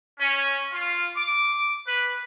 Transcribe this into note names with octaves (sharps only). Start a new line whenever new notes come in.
C#4
F4
D6
B4